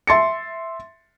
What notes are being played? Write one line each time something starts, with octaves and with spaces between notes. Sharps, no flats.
E5 C6 A6 C#7